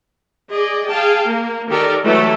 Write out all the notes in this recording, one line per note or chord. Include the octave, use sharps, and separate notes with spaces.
G#4 D5 D#5
G#4 F5 G5 A5
A#3
D#3 G4 A4 A#4 D5
E3 F#3 A3 F#4 A4